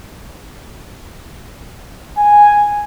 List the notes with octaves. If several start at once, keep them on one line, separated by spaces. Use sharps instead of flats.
G#5